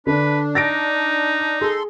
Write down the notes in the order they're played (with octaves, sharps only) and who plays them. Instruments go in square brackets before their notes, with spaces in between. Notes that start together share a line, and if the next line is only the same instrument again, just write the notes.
[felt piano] D3 [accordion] D4 [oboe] B4
[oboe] D#4 [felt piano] A6 A#6 D7
[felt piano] G#4 [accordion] A4 C6